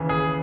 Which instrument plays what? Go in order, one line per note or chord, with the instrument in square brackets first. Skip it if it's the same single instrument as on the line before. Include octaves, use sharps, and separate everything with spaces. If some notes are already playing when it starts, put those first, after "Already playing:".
Already playing: [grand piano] D#2 C#3 E3
G#4